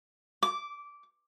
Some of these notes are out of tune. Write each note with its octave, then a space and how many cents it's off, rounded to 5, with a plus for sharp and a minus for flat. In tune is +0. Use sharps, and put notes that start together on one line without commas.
D6 -15